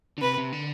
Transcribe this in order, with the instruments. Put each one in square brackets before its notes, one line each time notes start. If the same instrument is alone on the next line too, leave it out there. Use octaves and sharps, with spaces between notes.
[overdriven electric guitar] D3
[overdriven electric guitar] C3 [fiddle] B4
[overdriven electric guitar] C3
D3